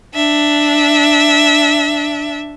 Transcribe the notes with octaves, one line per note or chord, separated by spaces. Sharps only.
D4 E5